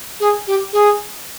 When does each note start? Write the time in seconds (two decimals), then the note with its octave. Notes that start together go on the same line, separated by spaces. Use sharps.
0.20 G#4
0.47 G4
0.73 G#4